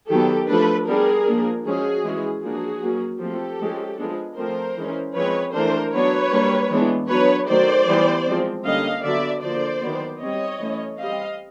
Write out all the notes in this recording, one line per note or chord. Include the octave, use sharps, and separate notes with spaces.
D#3 F#3 B3 G4 A4
F3 A3 D4 A4 B4
G3 B3 D4 G#4 A#4
F3 A#3 D4
F3 G#3 C#4 F#4 G#4
E3 G#3 C#4
F3 A#3 D4 F#4 G#4
F#3 A#3 C#4
F3 A3 C4 G4 A4
F3 G#3 C#4
F3 G#3 B3 D4
F3 A3 C4 A#4 C5
E3 G#3 C#4
F3 G#3 C4 B4 C#5
E3 A3 D4 A#4 C5
F#3 B3 D4 B4 C#5
G3 A#3 D4
E3 G#3 B3 D4
F#3 B3 D4 B4 C#5
D#3 F#3 A3 C5 D5
E3 G3 B3
F3 G#3 C4
D3 G3 A#3 C#4 D#5 F5
D3 F#3 B3 D5 E5
D3 F3 A#3 C5 D5
D#3 F#3 B3
G3 C4 C#5 D#5
E3 A3 C#4
G3 C4 D#5 F5